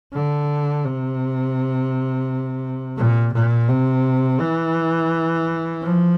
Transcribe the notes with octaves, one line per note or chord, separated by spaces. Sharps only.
D3
C3
A#2
A#2
C3
E3
F3